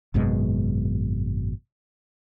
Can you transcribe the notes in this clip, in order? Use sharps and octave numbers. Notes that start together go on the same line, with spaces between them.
G#1 F#2 B2 G#3